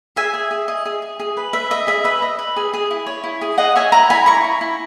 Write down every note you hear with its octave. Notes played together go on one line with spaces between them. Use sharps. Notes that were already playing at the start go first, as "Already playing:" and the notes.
G#4 E5 G#5
G#4
G#4
D#5
G#4
G#4
G#4
B4
B4 E5
D#5 E5
G#4 E5
B4 E5
D#5
B4
G#4
G#4
E4
C#5
E4
G#4
G#4 D#5 F#5
C#5 E5 G#5
E4 F#5 A#5
E4 G#5 B5
E4 A#5 C#6
E4
E4